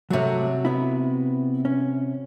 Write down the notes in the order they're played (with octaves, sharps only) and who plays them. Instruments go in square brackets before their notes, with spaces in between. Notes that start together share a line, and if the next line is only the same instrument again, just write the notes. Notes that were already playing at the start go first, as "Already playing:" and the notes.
[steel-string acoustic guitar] C3 F#4 [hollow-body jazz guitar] F#3 A3 C#5
[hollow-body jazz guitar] B3 E4
C#4